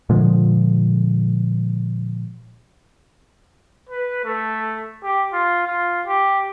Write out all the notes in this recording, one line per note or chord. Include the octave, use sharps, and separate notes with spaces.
A#2 D3 F3 G#3
B4
A3
G4
F4
F4
G4